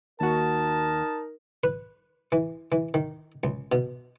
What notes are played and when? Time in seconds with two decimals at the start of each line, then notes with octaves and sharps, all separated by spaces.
0.20 D#2 D#4 F#4 A#4 A5
1.64 B4
2.32 E3
2.72 E3
2.94 D#3
3.44 C#2
3.72 B2